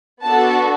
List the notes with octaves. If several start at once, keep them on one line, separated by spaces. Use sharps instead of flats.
B3 D4 F#4 A4 A5